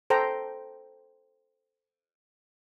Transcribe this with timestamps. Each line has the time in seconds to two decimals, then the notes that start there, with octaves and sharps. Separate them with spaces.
0.10 A4 C5 G5 A#5